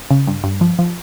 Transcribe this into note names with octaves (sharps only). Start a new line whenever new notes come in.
C#3
G2
G2
F3
F3